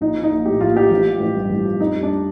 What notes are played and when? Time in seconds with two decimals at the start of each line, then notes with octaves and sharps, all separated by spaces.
0.01 A#1 D#4
0.16 F3
0.23 D#4
0.32 A#1
0.46 A2 G4
0.61 A#1 F4
0.75 F3 G4
0.91 A1
1.06 F3
1.20 A1
1.35 G2
1.50 A1
1.65 F3
1.80 F2 D#4
1.95 G3
2.03 D4